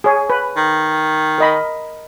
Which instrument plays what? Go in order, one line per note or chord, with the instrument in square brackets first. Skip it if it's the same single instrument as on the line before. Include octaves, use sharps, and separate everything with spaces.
[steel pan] G#4 C#5
B4
[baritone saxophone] D#3
[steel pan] A#4 D#5 B5